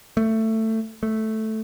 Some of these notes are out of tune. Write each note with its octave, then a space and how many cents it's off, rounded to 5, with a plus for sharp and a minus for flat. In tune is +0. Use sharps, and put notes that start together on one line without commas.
A3 +15
A3 -5